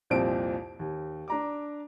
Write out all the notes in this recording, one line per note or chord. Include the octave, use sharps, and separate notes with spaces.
C2 F2 A#2 C4 C5 D7
D#2
D4 A#5 D6